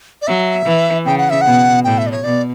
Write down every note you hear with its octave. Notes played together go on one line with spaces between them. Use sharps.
D5
F#3 E5
E3
C#3 G5
F#5
E5
B2 F#5
A2 G5
E5
D5
C#5
B2 D5